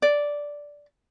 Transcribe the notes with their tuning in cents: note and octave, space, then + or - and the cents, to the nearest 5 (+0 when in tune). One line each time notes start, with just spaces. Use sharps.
D5 -5